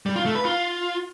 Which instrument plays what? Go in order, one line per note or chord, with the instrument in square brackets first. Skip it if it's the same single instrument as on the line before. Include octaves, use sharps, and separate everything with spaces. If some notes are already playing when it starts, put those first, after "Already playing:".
[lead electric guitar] G3
F4
A3
B4
F4